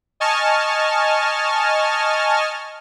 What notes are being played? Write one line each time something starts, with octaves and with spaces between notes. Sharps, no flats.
D#5 G#5 A5 C#6 F6